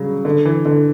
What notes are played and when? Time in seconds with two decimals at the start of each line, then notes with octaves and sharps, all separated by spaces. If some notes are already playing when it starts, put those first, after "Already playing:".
Already playing: C#3 F#3 G3
0.25 D3
0.45 E3
0.66 D3